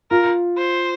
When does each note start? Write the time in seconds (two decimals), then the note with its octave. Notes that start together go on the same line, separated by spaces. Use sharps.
0.11 F4 A#4
0.57 C5